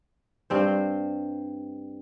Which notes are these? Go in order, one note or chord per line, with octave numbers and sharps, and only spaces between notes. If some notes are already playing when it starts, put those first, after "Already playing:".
G2 C4 C5